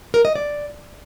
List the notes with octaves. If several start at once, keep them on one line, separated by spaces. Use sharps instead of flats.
A#4
D#5
D5